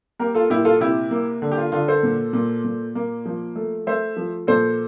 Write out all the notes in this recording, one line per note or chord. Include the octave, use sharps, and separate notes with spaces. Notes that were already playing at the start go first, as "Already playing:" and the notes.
A#3 G4 A#4
F4 A4
A#2 E4 G4
F4 A4
C3 E4 G4
A#3
D3
G4
F4
D3 F4
A4 C5
A#2
A#2
A#2
A#3
F3
A3
A3 C5 E5
F3
A#2 A4 C5